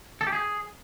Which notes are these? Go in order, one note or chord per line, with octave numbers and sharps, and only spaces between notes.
A4
G4
G#4